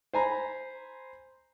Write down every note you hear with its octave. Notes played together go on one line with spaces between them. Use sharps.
C5 G#5 A#5 B5